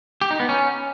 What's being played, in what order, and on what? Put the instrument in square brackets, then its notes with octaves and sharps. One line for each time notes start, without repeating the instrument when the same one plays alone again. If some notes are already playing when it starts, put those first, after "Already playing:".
[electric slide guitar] G4
D#4
B3
C#4